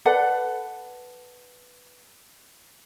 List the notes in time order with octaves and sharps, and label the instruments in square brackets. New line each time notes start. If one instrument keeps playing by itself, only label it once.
[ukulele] A4 B4 D5 F#5